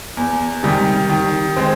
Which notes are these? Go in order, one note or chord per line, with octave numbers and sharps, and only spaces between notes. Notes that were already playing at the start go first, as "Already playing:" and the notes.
E2
C3 D#3 G3
D#3
G#3 C4